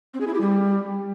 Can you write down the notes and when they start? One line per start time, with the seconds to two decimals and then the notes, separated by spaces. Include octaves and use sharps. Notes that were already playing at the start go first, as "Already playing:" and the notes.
0.14 C4
0.20 G#4
0.27 E4
0.34 G4
0.41 G3